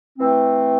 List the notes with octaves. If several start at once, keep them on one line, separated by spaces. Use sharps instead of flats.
E3 A3 C4